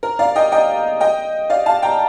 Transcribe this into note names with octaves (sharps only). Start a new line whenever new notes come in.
A#4
D5 F5
D#5 G5
D#5 G5
D#5 G5
D5 F5
F5 A5
G5 A#5